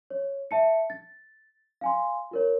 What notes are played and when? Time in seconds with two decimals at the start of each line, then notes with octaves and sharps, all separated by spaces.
0.10 C#5
0.51 E5 A5 C#7
0.90 A6
1.81 F5 G#5 C6
2.31 F4 A#4 C#5